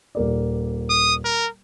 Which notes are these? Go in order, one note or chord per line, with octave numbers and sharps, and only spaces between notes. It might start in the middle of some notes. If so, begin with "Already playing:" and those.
D#1 A#3 D5
D#6
A#4